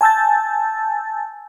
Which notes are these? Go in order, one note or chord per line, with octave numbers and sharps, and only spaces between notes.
G#5 A5 E6 G6 A6